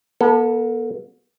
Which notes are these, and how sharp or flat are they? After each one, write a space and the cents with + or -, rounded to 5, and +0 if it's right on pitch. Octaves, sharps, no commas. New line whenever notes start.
B3 -45 A4 +10